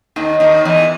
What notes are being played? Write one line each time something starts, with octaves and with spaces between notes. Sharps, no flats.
D#2 D#3
D#2 D#3
E2 E3